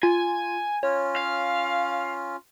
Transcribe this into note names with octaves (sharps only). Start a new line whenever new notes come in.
F4 G#5
C#4 F4 C#5
F5